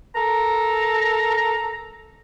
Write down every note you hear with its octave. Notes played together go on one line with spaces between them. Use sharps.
A4 A#4 A#5